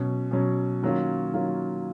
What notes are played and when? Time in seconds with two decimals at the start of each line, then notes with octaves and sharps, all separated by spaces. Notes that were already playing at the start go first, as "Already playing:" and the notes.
Already playing: B2 F#3 C#4
0.31 B2 F#3 C#4
0.82 D#3 F#3 A#3 C#4 F4
1.33 D#3 F#3 A#3 C#4 F4